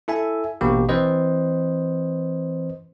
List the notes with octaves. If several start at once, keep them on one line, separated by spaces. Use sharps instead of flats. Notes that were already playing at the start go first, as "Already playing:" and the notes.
E4 A4 E5 G#5
A1 B2 A#3 G4
E3 C4 B4 C5 D#5